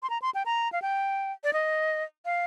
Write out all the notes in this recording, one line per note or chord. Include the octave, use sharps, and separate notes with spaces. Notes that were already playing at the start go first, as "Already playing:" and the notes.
C6
A#5
C6
G5
A#5
F5
G5
D5
D#5
F5